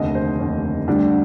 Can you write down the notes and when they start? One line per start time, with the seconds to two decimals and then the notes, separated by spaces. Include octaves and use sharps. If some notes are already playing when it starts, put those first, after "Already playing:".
Already playing: F1 D#2 D3 D#5
0.15 C5
0.39 F1 D#2 D3
0.87 D2 D3 G3 D4